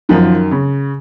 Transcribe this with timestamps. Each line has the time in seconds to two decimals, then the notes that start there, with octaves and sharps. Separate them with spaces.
0.09 F#2 D#3 F3
0.51 C#3